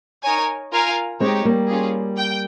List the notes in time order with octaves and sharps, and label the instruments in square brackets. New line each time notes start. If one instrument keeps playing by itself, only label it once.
[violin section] D#4 A#4 C#5 G#5
F4 A#4 F5 G#5
[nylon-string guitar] G#3 C4 [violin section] D#4 G4 C#5
[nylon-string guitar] G3 A#3
[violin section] C#4 F4 G#4
G5